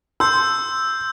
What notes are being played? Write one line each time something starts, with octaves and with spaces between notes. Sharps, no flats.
C6 E6 G6